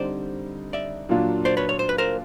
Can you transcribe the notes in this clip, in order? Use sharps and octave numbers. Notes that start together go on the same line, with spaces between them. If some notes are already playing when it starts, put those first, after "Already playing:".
Already playing: D3 G3 C4 D#4 C5 D5
D5 E5
A#2 F#3 A#3 D4 F4
C5 D5
B4 C#5
C#5
C5
B4
A#4 C5